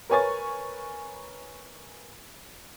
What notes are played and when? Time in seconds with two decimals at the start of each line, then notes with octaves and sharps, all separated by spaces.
0.10 A#4 B4 C#5 G#5 C#6 A6